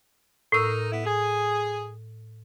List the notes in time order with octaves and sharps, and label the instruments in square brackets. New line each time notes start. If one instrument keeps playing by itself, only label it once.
[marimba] A2 E6 [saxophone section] D#4 A#4
[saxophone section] B3 E4
G#4